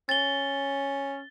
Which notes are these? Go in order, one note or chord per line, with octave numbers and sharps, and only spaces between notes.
C#4 A6 G7